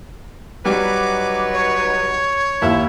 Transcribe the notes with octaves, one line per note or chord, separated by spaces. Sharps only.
F#3 G3 D#4 B4 D6
C#5
D#2 E4